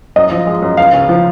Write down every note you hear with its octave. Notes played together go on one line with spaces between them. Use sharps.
F#2 D#5
F3
G#3
F#2
C#2 F5
C#3
F3